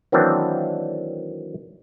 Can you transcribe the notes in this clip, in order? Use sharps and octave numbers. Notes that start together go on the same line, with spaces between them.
D#3 E3 F#3 A#3 C4 D4